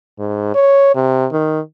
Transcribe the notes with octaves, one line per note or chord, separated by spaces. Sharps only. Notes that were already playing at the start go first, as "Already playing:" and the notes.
G#2
C#5
C3
D#3